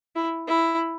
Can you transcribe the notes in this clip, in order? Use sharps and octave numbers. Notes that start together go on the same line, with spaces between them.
E4
E4